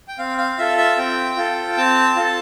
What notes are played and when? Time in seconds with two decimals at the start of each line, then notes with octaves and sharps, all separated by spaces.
0.08 G5
0.18 C4 F5
0.38 F5
0.58 F4 A4 E5
0.78 E5
0.98 C4 G5
1.37 F4 A4
1.77 C4 A5
2.16 F4 A4